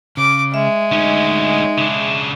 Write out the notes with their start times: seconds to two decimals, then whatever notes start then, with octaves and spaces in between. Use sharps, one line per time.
0.17 C#3 D6
0.54 G#3 E5
0.92 D2 C#4 D#4
1.78 C#3 D4